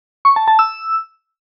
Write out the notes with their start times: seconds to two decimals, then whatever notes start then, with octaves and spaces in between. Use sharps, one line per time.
0.25 C#6
0.36 A5
0.48 A5
0.59 E6